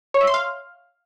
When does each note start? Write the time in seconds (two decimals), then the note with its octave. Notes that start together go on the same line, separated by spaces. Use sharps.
0.14 C#5
0.21 E5
0.27 C6
0.34 F5